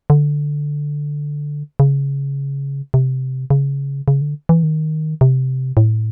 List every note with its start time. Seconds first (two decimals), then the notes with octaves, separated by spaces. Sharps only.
0.10 D3
1.80 C#3
2.94 C3
3.50 C#3
4.08 C#3
4.21 D3
4.49 E3
4.63 D#3
5.21 C3
5.77 A2